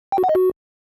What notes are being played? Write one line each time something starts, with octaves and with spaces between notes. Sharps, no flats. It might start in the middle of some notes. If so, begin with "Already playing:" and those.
G5
F#4
F#5
D#5
F#4